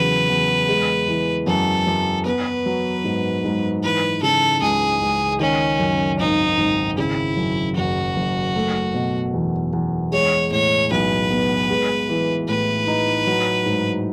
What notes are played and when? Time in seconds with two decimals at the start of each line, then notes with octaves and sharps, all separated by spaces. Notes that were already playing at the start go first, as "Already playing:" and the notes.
Already playing: E2 C#3 F#3 B4
0.29 E2
0.69 G#3
1.08 E3
1.47 F#2 A4
1.87 F#2
2.26 B3 B4
2.66 F#3
3.04 G#2
3.45 G#2
3.83 E3 B4
4.22 C#3 A4
4.62 C#2 G#4
5.01 C#2
5.40 D#3 C#4
5.79 F#2
6.19 G#1 D#4
6.58 G#1
6.98 C#3 E4
7.37 F#2
7.76 F#1 F#4
8.16 F#1
8.56 A3
8.94 B2
9.34 E2
9.73 E2
10.12 G#3 C#5
10.51 A2 C#5
10.91 B1 B4
11.31 B3
11.70 G#3
12.09 E3
12.48 A2 B4
12.87 D#4
13.27 F#3
13.66 G#2